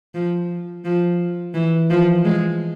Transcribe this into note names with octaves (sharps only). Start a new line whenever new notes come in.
F3
F3
E3
F3
G#3